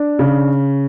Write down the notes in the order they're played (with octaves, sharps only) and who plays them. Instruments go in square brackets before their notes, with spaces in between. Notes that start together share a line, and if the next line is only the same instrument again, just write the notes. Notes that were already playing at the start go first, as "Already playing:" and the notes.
Already playing: [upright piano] D4
C#3